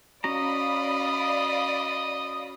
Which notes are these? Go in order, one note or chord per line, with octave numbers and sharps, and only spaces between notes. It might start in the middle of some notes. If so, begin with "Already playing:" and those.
C#4 F#4 D5 D#5 F5 A#5 B5